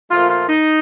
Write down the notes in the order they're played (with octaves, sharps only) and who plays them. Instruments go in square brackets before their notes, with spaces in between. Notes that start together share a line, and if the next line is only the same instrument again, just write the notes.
[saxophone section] A#2 F3 A3 F4
F4
D#4